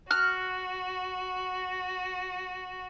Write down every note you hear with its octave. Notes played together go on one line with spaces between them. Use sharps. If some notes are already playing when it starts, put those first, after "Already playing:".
F#4 F6 F#6